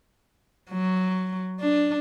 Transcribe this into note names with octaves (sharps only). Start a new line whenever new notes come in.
F#3
D4